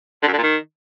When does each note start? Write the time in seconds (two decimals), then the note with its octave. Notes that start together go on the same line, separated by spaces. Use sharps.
0.23 D3
0.28 F#2
0.33 D3
0.38 A#2
0.43 D#3